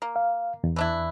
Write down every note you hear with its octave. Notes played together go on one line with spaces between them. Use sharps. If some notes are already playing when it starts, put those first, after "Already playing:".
A#3
F5
E2
E3 D4 E4